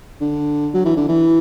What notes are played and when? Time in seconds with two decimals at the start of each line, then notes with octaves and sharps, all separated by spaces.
0.21 D3
0.74 F#3
0.85 E3
0.97 D3
1.08 E3